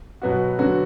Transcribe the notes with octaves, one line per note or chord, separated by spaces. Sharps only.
B2 F#3 B3 F#4
D3 F#3 B3 F#4